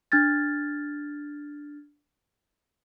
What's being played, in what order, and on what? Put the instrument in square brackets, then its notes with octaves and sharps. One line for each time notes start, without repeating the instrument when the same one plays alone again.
[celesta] D4 F6 G#6 A6